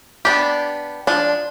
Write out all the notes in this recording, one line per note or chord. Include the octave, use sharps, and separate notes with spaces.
B3 D4 G4
F3 D4